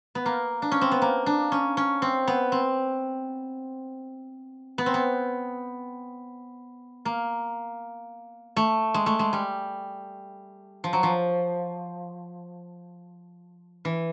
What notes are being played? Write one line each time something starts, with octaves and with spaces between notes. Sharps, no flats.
B3
A#3
D4
C#4
C4
B3
A#3
D4
C#4
C#4
C4
B3
C4
B3
C4
B3
A#3
A3
G#3
A3
G#3
G3
F3
F#3
F3
E3